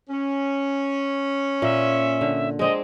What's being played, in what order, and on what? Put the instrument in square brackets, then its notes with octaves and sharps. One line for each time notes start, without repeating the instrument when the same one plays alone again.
[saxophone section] C#4
[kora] A#2 [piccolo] E5
[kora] D3
[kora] G#3 C4 D4 [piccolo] D#5